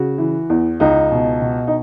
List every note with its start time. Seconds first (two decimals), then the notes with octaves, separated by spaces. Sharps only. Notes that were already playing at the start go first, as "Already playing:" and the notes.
Already playing: C#3 F#4
0.18 E3
0.50 E2
0.80 C#2 D#4
1.12 B2
1.42 B2
1.67 D#4